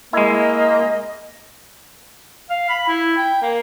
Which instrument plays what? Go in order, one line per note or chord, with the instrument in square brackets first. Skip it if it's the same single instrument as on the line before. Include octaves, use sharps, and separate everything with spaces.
[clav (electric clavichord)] G#3 E4 [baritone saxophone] A#3 [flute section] D#5
[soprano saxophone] F5
B5
E4
G5
A#3